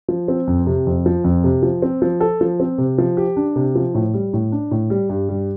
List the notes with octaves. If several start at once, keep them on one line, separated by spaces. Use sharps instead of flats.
F3
C4
F2
C3
F2
F3
F2
C3
F3
C4
F3
A4
F3
C4
C3
F3
G4
D4
C3
F3
A2
G3
A2
D4
A2
G3
G2
G3